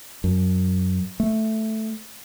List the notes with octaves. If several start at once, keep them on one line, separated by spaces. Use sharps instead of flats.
F#2
A3